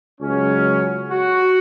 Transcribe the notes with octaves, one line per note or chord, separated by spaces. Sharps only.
C#2 C#3 F#3 C#4
F#4